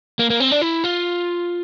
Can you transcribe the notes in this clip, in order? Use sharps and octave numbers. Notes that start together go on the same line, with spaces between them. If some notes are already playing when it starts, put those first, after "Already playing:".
A#3
A#3
C4
D4
E4
F4